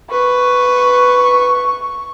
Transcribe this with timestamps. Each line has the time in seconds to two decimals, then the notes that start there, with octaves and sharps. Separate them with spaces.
0.11 B4 C#6